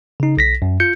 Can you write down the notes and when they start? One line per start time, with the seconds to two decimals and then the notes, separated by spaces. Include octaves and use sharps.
0.20 C#3 D#4
0.37 B1 A#6 B6
0.62 F#2
0.80 F4 G6 C#7